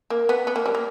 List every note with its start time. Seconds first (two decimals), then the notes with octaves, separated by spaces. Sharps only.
0.10 A#3
0.29 B3
0.47 B3
0.56 A#3
0.66 G3
0.75 A#3